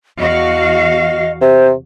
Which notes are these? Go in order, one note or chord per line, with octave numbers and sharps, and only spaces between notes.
E2 F#4 D#5 F5
C3 C5